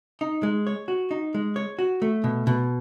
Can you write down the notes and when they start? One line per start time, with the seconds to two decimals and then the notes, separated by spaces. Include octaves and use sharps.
0.21 D#4
0.43 G#3
0.67 C#5
0.88 F#4
1.11 D#4
1.34 G#3
1.56 C#5
1.79 F#4
2.02 A3
2.24 B2
2.47 B2